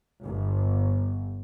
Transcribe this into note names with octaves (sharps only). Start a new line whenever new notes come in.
G1